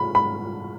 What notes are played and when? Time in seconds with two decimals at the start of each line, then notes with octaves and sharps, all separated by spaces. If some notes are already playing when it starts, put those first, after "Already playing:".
Already playing: B5
0.15 B5